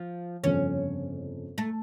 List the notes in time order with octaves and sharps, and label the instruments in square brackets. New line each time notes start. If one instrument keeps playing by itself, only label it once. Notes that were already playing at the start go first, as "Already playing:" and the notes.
Already playing: [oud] F3
[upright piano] G1 F2 C#3 [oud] C#4
[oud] A3